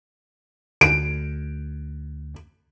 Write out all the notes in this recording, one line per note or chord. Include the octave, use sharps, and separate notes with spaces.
D2 D7